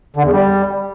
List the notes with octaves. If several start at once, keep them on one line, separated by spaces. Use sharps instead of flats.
D3
E2
G3